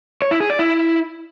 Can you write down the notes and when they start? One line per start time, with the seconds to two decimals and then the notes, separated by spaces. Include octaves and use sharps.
0.22 C#5
0.31 E4
0.40 G#4
0.50 D5
0.59 E4